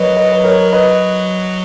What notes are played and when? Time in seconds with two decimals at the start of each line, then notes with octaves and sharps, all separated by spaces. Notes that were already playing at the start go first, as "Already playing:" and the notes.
Already playing: F#3 A#4 B4 C#5 D#5
0.16 B4 D#5
0.32 B4
0.44 A#4 C#5
0.73 B4 D#5